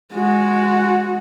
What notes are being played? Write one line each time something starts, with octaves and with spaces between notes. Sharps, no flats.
G#3 F#4